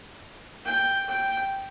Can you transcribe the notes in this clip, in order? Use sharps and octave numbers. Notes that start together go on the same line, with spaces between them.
G5
G5